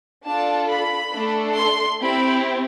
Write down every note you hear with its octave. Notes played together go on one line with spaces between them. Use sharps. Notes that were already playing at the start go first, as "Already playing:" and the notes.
D4 F4 A4 A5
B5
A3 D4 A4
C6
C4 E4 G4 B5